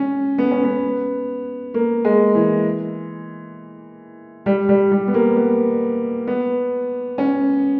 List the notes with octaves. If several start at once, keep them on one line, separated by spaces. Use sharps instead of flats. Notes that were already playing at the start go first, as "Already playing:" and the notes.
Already playing: C#4
B3
C#4
B3
A#3
G#3
E3
G3
G3
G3
B3
A#3
B3
B3
C#4